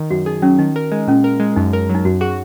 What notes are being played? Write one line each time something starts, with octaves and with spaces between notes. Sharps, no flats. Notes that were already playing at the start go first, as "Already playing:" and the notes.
Already playing: D#3
F#2 F#4
D#4 G#4
F#3 C#4
D#3 D#4
A#4
G#3
A#2 C#4
A#4
G#3
F#2 D#4
A#4
F#3
D#4
F#2 F#4
F#4 G#4